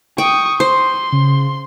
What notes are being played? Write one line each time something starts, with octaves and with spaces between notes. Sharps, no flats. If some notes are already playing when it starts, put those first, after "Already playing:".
G5 C#6 D#6
C5 C6
C#3